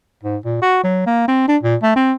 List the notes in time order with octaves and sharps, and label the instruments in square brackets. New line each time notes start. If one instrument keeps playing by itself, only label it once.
[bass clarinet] G#2
A#2
F#4
F#3
A#3
C4
D4
A#2
A3
C4